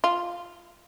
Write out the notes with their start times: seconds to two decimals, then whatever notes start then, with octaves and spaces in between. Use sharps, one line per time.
0.04 F4